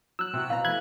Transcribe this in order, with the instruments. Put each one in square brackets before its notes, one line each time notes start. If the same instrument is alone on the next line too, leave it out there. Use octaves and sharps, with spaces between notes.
[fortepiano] F#3 [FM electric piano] E6 F#6
[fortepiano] C3 F#4
[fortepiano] B2 C4 A#5 [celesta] F5
[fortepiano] E3 A3 [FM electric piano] B5 F#6 G#6